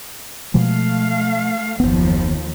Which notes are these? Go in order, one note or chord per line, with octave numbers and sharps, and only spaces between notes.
B2 F3 G#3 A3 F5
F#1 D#2 F3 B3